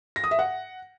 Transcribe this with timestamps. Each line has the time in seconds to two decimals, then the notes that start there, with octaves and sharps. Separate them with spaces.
0.16 A#6
0.24 D#6
0.31 E5
0.39 F#5